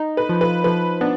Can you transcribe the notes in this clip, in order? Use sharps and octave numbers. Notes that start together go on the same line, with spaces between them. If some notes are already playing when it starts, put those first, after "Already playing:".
Already playing: D#4
B4
F3
B4
F3 B4
B3 D4